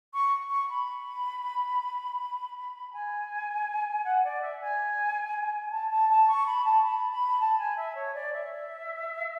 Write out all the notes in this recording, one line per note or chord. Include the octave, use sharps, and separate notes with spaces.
C#6
C#6
B5
G#5
F#5
D5
E5
G#5
A5
A5
A5
C#6
B5
A5
B5
B5
A5
G#5
E5
C#5
D5
E5